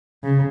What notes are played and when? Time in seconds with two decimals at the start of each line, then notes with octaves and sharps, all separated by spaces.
0.24 C#3